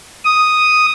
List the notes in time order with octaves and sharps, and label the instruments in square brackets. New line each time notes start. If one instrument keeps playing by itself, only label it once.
[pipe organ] D#6